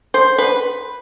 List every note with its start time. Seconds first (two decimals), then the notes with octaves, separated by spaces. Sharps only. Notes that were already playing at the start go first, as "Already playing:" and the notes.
0.14 C5
0.38 B4